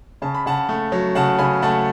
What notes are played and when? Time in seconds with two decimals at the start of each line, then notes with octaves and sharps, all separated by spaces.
0.22 C#3 A5
0.34 B5
0.46 C#3 F#5 A5
0.69 A3
0.92 F#3
1.15 C#3 F#5 A5
1.39 C#3 G#5 B5
1.62 A3 F#5 A5